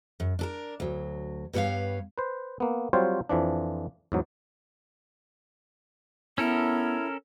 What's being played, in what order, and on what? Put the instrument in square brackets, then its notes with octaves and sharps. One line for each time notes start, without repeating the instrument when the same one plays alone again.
[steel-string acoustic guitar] F#2
D4 A4 A#4
D2 F#3
G2 G3 B3 E4 C#5 F5
[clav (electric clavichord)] B4 C5
A#3 B3
F#3 G3 C4 F4 C5 C#5
F2 E3 F3 D4
E2 G#2 F#3
[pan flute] B3 [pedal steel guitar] C#4 A4 A#4 [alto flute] E4